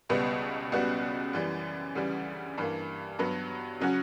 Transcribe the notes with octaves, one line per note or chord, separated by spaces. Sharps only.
C#2 B2 G3 B3
C#2 C#3 G3 B3 F#4
F#2 E3 G3
D2 C#3 E3 G3
G2 E3 A#3
G2 F#3 B3
C#3 F#3 C#4 F#4